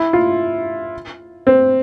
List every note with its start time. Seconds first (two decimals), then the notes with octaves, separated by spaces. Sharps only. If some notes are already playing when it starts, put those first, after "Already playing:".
Already playing: E4
0.13 F4
1.47 C4